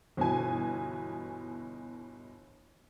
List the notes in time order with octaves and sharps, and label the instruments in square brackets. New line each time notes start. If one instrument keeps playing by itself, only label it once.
[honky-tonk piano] G1 B2 E3 G#5